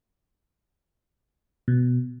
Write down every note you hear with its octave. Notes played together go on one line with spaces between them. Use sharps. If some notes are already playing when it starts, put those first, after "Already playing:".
B2